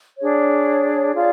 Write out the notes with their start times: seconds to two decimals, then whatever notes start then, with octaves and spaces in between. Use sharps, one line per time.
0.18 D4 G#4 C#5
1.14 F4 G#4 D5 F5